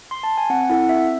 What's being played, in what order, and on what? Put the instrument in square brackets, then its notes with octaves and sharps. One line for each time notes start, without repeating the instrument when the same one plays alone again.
[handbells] C6
A5
G#5
C4 F#5
E4 A4 F#5
C4 E5